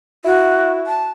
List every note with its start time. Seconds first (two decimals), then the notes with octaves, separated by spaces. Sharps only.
0.25 E4 F#4
0.87 A5